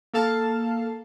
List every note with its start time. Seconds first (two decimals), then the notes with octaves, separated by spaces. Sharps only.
0.14 A#3 A4 F5 A5